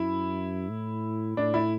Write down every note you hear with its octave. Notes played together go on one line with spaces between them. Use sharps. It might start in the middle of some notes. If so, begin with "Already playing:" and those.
Already playing: F#2 E4
A2
A2 D4
E4